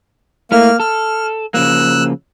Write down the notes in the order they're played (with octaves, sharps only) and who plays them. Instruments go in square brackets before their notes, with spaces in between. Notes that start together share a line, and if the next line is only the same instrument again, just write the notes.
[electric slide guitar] A3 E4 [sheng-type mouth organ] A#3 F6
[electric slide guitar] A4 [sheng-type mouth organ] F6
[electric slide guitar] C#3 F3 A#3 [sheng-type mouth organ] E6 F#6